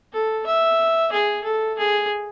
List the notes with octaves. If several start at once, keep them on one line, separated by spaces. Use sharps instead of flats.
A4
E5
G#4
A4
G#4